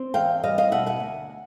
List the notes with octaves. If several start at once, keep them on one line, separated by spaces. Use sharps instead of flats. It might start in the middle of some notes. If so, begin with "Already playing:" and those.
Already playing: C4
E2 F5 G5
G3 D#5 F5
D#5 F5
B2 E5 F#5
F#5 G#5
D2